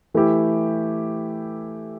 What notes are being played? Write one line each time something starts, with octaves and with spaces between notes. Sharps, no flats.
E3 A3 E4 G4